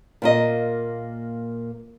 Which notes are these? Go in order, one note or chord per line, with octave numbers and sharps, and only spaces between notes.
A#2 A#3 D#5